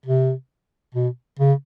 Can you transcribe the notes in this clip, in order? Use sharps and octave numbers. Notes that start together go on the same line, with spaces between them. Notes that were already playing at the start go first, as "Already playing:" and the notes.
C3
B2
C#3